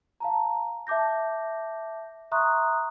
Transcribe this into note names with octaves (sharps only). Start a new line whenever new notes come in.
F5 A5 A#5
E5 A5 D6 G6 A#6
E5 A#5 C6 C#6 D#6 F#6